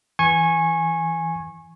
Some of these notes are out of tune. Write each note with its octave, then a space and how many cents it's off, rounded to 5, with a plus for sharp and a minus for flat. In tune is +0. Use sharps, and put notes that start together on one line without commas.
E3 +0 G#5 +0 C#6 -25